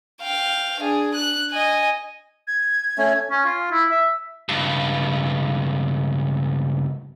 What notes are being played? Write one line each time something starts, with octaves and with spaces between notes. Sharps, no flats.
F5 G5
D4 G#4
F#6
D#5 G#5
G#6
A3 C#4
C#4
F4
E4
E5
C#2 G2